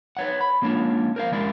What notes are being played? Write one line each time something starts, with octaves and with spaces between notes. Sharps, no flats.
B4 C#5 F#5
B5
G#3 A#3 C#4 D4 F4
A#4 C5 F5
G#3 C#4 E4 A#4 D5